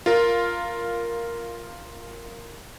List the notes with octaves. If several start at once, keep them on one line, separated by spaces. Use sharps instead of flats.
F4 A#4